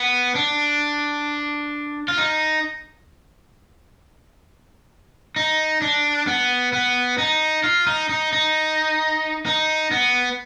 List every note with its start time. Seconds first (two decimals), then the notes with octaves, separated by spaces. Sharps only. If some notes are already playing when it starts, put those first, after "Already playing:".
Already playing: B3
0.35 D4
2.08 F4
2.17 D#4
5.36 D#4
5.82 D4
6.27 B3
6.73 B3
7.18 D#4
7.64 F4
7.87 D#4
8.09 D#4
8.33 D#4
9.46 D#4
9.91 B3